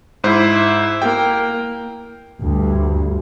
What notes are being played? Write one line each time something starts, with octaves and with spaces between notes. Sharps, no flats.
G#2 E4 C5
A#3 G5
D2 G2